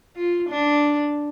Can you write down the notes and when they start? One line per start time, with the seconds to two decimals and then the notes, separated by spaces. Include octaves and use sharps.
0.16 F4
0.49 D4